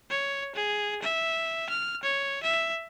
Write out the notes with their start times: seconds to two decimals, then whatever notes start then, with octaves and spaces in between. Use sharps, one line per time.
0.10 C#5
0.55 G#4
1.02 E5
1.69 F6
2.03 C#5
2.43 E5